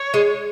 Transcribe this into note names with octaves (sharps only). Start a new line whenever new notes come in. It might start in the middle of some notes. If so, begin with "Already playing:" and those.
Already playing: C#5
G#3